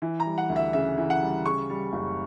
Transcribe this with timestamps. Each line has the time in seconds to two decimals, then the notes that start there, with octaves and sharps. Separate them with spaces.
0.02 E3
0.20 A#5
0.26 G3
0.38 F#5
0.49 D2
0.56 E5
0.73 C#3 E5
0.98 E3
1.10 F#5
1.22 G3
1.46 C#3 C#6
1.70 G3
1.93 F#1